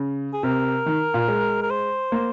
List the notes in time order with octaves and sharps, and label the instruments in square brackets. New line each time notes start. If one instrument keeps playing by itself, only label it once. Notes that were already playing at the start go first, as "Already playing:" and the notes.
Already playing: [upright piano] C#3
[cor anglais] G#4
[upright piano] C3 [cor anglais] A#4
[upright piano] D#3
A#2
G#3
[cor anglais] A#4
C5
[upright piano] A#3